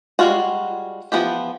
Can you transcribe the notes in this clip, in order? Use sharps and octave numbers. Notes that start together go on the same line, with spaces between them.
G3 G#3 C4 F4 F#4
E3 F3 B3 G4